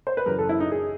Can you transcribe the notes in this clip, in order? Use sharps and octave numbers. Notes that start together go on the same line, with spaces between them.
C5
B4
F#2 C#3 E3 A#4
A4
E4
D#4
G#4